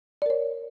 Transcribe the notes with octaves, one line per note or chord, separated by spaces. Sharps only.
A#4 C#5 D5